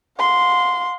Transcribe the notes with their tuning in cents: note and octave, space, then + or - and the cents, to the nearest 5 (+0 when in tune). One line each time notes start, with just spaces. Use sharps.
F5 +45 C6 -5